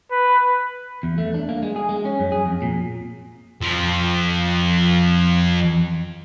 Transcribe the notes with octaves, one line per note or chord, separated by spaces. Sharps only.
B4
E2
A3
D4
A#3
G#3
G#4
G#3
C#4
F#2
G#4
F2
A#2
F2 F3